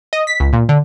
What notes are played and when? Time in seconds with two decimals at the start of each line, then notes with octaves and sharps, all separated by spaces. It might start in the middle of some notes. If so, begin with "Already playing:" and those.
0.13 D#5
0.27 B6
0.40 C#2
0.53 A#2
0.69 D3